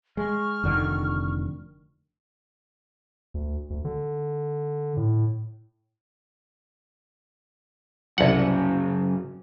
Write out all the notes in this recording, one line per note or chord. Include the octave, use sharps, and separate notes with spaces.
G#3 C#6 F6
F1 D3 D#3
D2
D2
D3
A2
C2 F#2 C#3 F#5